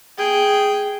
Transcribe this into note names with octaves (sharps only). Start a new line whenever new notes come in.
G#4 G5